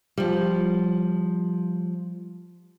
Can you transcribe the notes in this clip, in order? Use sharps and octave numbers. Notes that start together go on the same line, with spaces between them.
F3 G3